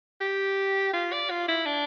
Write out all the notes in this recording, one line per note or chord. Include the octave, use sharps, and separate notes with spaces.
G4
F4
D5
F4
E4
D4